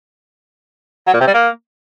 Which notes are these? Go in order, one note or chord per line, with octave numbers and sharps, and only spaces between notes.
F#3
A#2
C3
G3
A#3